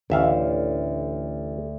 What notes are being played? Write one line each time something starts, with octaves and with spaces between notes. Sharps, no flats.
A1 D2 E5 F5